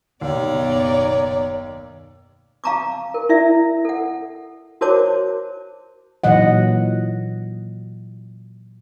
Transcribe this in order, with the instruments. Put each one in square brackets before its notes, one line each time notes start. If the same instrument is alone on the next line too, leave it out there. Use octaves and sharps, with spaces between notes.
[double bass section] F#1 B2 B3 [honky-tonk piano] D#2 [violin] D#4 D5 [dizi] C#5
[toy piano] F5 A5 A#5 C#6 D6
A#4
E4 D5 E5
A4 F#5
F#4 A#4 C5 C#5 A5 D6
[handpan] A#2 E3 F#3 D#5 F#5